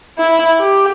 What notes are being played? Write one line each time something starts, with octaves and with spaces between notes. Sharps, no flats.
E4
G4